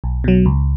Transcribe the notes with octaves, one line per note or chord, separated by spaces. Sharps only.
B1
B2 F#3
C#2